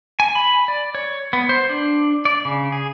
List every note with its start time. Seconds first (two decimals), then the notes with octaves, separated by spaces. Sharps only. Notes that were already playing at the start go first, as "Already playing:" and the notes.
0.20 G#5
0.35 B5
0.68 D5
0.95 C#5
1.33 B3
1.49 C5
1.69 D4
2.25 D5
2.45 C#3
2.72 G#4